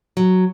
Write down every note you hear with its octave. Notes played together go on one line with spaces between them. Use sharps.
F#3